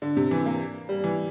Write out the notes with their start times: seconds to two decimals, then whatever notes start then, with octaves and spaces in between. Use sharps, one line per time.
0.02 D3
0.16 C3
0.31 E3
0.46 A#3
0.89 G3
1.04 E3